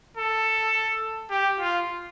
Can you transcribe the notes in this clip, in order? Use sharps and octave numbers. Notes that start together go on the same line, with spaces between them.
A4
G4
F4